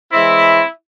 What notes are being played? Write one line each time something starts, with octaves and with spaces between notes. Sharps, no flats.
E3 G#3 C4 E4